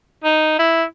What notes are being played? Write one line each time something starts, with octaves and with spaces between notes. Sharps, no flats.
D#4
E4